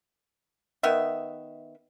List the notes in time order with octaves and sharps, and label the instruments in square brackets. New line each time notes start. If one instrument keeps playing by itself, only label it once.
[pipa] D#3 B3 E5